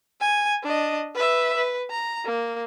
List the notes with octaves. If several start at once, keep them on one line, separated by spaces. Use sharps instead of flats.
G#5
D4 D#5
B4 E5
B4
A#5
A#3